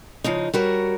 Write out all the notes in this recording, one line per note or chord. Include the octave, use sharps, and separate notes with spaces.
C#3 F3 G#3 D#4
G3 F#4 A#4 C#5